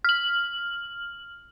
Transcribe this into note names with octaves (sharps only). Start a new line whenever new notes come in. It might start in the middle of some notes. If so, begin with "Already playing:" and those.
F6 F#7